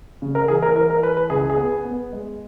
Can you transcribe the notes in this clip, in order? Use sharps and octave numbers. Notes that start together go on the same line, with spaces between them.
C#3
A#4
E3 G#4
A#4
E3 A#4
A#4
E3 B4
B4
C#2 G#4
G#4
B3
B3
G#3